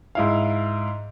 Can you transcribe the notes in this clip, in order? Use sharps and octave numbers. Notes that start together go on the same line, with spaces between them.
G#2 E4 F5